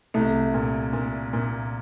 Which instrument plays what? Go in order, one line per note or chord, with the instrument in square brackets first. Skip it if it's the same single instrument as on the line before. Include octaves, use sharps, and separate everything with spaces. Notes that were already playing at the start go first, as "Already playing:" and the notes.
[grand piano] C2 [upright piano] A3
[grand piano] A#2
A#2
A#2